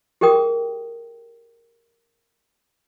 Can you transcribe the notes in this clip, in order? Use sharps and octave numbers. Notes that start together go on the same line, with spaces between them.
G4 G#4 A#4 G5 D#6